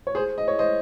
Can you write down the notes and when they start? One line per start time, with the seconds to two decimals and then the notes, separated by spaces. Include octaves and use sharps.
0.07 C#5
0.15 G#4 C5
0.38 D#5
0.48 C#5
0.59 C5 D#5